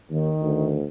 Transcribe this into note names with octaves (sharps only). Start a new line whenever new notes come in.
D#2 D#3
D2